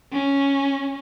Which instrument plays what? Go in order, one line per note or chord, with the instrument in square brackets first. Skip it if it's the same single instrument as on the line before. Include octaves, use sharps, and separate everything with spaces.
[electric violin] C#4